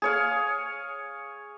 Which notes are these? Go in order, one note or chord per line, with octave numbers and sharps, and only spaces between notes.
G#4 C#5 F5